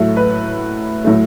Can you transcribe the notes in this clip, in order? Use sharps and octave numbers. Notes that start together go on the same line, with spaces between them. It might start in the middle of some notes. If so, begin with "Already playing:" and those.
Already playing: A2 F#3 A3
B4
A2 F#3 A3